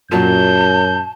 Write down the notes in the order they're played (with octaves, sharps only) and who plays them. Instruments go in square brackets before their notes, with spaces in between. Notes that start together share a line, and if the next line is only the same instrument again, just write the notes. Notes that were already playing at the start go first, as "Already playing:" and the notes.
[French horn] F#2 [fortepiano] A#2 F#3 [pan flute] A5 [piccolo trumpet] G6